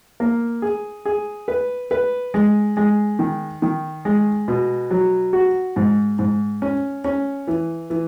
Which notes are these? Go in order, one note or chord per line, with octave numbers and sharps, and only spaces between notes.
A#3
G#4
G#4
B4
B4
G#3
G#3
D#3
D#3
G#3
B2
F#3
F#4
G#2
G#2
C#4
C#4
E3
E3